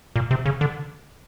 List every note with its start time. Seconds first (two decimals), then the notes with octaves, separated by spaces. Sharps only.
0.16 A#2
0.31 C3
0.46 C#3
0.61 D3